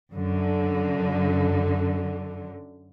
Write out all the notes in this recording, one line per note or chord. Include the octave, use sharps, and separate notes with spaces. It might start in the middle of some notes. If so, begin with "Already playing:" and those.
F#2 D3